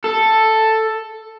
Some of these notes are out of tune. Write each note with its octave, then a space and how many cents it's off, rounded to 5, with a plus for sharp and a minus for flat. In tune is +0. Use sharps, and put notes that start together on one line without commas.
A4 +5